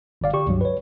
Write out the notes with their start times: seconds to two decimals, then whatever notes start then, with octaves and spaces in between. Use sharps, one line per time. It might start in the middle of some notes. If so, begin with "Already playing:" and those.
0.21 G1 D3 D5 F5
0.33 D3 G4 C#6
0.47 C#2 G2 F#3
0.61 B4 C#5